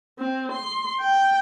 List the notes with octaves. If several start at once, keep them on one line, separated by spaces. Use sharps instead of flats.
C4
C6
G5